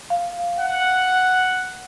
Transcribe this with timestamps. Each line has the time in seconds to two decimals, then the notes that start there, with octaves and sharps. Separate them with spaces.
0.10 F5
0.58 F#5